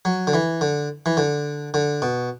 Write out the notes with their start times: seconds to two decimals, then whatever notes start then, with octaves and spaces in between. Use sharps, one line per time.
0.05 F#3
0.27 D3
0.34 E3
0.61 D3
1.06 E3
1.17 D3
1.74 D3
2.02 B2